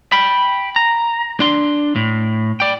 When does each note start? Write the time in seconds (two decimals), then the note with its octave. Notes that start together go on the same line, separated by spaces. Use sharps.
0.12 G5 B5
0.76 A#5
1.40 D4 C6
1.96 A2
2.60 D5 G5